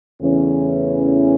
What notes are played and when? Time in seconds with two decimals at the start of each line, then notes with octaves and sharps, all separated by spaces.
0.22 E2 C#3 E3 A3 C#4